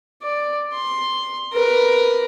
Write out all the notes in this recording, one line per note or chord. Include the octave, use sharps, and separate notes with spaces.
D5
C6
A#4 B4